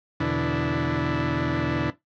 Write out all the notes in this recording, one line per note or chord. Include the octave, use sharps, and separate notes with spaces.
E2 B2 D3 D4 E4